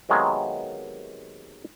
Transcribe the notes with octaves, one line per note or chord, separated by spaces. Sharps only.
C3 D#3 F#3 G#3 A#3 B3